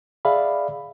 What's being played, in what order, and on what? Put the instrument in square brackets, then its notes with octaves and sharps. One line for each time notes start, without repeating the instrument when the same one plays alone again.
[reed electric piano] G#4 D5 E5 F5 B5